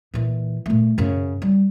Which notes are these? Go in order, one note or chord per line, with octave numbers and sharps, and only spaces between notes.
A#2 E3
A#2 A3
F#2 C#3
G3